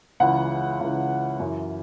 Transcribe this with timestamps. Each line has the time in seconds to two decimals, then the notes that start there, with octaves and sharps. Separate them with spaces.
0.20 C#2 C#3 E3 F#5
0.80 C#2 C#3 E3
1.39 F#2 E3